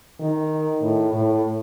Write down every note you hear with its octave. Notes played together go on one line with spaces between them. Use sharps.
D#3
A2
A2